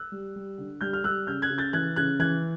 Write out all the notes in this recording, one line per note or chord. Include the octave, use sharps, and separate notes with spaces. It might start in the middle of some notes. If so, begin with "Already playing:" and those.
Already playing: E6 F#6
G3
G3
D3
G3 F6 G6
F6
G3 E6 F#6
C#3 F6 G6
F#6 G#6
C#3
G6 A6
E3 F#6 G#6
C#3 F#6 G#6
E3 F#6 G#6